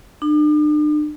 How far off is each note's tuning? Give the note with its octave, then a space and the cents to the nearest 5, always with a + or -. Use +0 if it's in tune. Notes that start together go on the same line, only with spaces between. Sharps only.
D4 +40